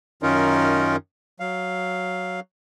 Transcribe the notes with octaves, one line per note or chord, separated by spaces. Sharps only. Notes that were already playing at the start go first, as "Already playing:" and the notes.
F#2 D#3 C#4 D#4 F4 A#4
F#3 F5